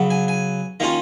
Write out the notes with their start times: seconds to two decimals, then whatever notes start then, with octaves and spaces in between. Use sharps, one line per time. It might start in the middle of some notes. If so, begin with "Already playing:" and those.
Already playing: C#3 F#3 B3
0.10 G#5
0.28 G#5
0.80 D#3 A#3 C#4 F4 A#5